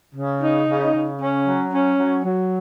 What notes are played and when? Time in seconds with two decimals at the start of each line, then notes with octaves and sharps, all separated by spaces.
0.15 C#3
0.42 D#4
0.67 C#3
0.94 C#3
1.20 C#4
1.46 F#3
1.72 C#4
1.99 F#3
2.25 F#3